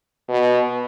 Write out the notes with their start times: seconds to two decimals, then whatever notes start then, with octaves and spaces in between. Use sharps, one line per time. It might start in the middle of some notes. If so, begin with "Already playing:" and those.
0.29 B2